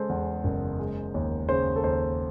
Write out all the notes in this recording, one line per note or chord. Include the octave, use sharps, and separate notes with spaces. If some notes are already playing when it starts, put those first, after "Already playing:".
Already playing: C#3 G#3 A4 C5
E2
F#1
G#3
D#2
C#3 C5
A4
D#2 C5